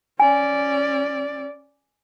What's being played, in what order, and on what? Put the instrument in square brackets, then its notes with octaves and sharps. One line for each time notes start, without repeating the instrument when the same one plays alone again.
[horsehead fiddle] C#4 D5 [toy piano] G#5